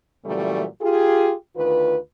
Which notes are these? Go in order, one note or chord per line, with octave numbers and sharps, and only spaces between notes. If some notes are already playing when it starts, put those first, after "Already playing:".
A#2 C#3 E3 F#3 G3 A3
F4 G4 G#4
D2 D#3 F4 B4